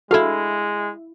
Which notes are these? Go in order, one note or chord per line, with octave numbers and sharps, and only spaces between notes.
G#3 E4 F#4 A4 F5 C6